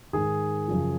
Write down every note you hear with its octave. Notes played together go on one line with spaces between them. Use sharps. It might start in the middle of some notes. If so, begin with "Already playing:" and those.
G#2 D#3 G#4
F#2 C#3 F3